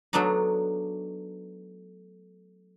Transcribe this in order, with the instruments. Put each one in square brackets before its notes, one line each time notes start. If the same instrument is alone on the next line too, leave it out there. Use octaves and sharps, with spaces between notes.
[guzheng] F#3 A3 B3 D4 D#4